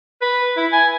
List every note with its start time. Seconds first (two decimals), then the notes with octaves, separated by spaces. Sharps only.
0.21 B4
0.57 E4
0.72 G#5